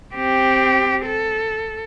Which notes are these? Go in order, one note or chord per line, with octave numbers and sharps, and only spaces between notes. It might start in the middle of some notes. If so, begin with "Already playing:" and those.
C4 G4
A4